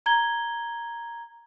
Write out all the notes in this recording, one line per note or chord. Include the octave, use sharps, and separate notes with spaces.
A#5 G#6 G7